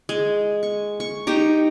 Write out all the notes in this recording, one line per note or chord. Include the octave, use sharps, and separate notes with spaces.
G#3
C#6
C#6
D#4 G4 A#5